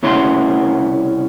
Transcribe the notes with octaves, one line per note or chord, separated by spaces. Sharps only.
C2 C#3 C#4 E4 C6